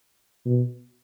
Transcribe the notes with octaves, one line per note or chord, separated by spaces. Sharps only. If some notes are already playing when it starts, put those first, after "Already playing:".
B2